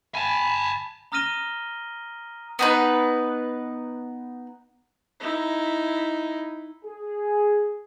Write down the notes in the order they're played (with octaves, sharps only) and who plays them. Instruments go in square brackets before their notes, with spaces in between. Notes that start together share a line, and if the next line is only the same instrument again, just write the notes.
[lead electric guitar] G#5 A5 [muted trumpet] B5
[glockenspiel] A#5 D#6 F6 A#6 D#7 G7
[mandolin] B3 D#4 B4
[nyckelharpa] D#4 E4
[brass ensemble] G#4